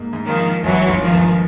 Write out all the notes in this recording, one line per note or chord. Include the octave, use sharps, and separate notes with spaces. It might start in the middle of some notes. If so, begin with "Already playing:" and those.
Already playing: G#2 A#3
G#2
D#3 F3
G#2
G1 E3 F#3
G1
D#3 F3
G1